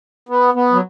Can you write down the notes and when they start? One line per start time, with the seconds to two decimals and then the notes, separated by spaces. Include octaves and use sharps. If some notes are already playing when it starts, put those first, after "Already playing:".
0.29 B3
0.54 B3
0.72 F#3